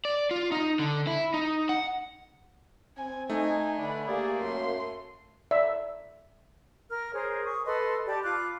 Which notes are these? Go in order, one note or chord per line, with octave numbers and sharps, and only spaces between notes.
D5
F4
D#4
D3
E4
D#4
F#5
C4 G#5
A3 D#4 G#5
D3 B4 D5 G#5
A#3 G4 G#4 D5
F#2 C6
D5 E5
A#4 F6
G#4 A#4 C5 C#5
C#6 D#6
A4 B4 D#5 C6
G4 D5 A5 B5
F4 B5 D6 F#6